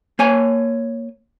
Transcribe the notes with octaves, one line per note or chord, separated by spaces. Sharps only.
A#3 C#5 G#5